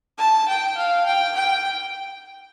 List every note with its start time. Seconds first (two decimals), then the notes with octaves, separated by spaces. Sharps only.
0.18 A5
0.48 G5
0.77 F5
1.06 G5
1.36 G5